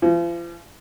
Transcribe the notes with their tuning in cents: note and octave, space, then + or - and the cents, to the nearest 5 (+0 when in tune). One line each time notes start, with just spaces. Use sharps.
F3 -45